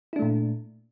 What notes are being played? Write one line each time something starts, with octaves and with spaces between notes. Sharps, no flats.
A#2 A3 D4 E4